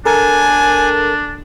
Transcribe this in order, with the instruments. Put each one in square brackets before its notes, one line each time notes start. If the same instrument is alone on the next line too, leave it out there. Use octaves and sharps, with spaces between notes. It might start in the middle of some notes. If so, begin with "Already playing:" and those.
[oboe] D4 [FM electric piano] A4 A#4 A5 [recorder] G#5